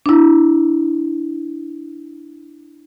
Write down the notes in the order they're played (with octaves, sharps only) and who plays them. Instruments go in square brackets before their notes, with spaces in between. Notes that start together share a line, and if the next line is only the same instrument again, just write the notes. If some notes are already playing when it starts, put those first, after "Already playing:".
[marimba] D4 E4